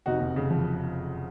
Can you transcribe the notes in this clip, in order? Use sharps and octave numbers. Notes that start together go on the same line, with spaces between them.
F1 D#4 F#4
F1
C#3
F3